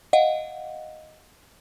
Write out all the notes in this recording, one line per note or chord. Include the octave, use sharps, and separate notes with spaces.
D#5 F5 F#5